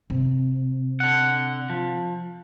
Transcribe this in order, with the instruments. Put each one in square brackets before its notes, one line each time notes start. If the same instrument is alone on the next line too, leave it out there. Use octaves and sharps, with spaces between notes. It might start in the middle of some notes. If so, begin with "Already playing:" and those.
[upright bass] C3
[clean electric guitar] D3 F#5
F3